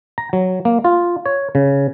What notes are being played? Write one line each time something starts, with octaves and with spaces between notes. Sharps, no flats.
A#5
F#3
A#3
F4
C#5
C#3